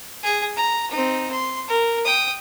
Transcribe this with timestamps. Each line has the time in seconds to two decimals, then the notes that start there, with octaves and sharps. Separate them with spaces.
0.23 G#4
0.56 A#5
0.91 C4 D#4
1.32 C6
1.68 A#4
2.05 G5 D#6